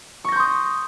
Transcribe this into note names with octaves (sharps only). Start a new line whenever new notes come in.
C6 C#6 D#6 G6 A#6